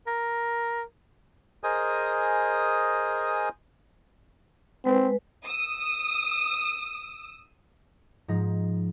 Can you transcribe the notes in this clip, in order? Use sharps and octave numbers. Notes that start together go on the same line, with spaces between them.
A#4
G#4 A#4 C5 D#5 G#5 D#6
G#3 C4 B4
D#6 E6
G#2 F3 D#4 A#6